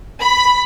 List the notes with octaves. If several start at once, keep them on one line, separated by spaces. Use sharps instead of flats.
B5